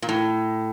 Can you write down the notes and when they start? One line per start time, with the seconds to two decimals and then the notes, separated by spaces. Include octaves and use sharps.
0.02 A#2
0.09 A2